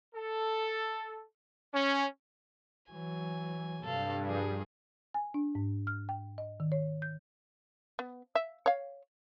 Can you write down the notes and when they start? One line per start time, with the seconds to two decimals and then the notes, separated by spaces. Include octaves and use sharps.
0.15 A4
1.74 C#4
2.92 E3 F#3 G#5
3.84 G2 C3 A4 F5
4.26 F3 G#4
5.14 G#5
5.34 D4
5.55 G#2
5.87 F6
6.09 G5
6.38 D#5
6.60 D#3
6.72 C#5
7.02 G6
7.99 B3
8.35 E5
8.66 C#5 F5